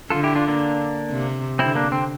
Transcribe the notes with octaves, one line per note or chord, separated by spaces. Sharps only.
D3 F4 A4
E4 G4
D4 F4
A#3 D4
C3
D3 C4 E4
A#3 D4
C4